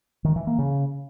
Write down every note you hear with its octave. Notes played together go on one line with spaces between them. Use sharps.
D#3
E3
A#3
C#3